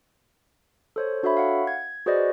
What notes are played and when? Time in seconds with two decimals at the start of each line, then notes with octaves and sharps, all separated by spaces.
0.96 A4 C5 C#5
1.23 D4 F#4 A4 C#5 E5 B5
1.37 F5 F#5
1.67 G#6
2.06 F#4 G#4 B4 C5 D5 D#5